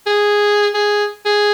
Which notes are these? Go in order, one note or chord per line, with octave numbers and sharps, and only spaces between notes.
G#4
G#4
G#4